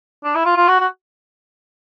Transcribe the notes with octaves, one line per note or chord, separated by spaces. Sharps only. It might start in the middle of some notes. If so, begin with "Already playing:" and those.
D4
E4
F4
F4
F#4
F#4